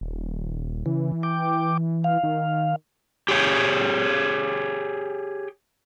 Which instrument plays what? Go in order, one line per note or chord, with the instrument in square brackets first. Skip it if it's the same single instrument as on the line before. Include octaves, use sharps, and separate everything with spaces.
[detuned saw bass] D#1
[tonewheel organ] C#3 [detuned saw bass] E3
[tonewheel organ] G5 D6
F5
[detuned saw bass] D#3
[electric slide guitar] G4 G#4 C#5 G5